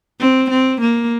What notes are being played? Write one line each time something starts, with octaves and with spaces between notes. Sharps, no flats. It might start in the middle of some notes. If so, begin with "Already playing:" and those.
C4
C4
A#3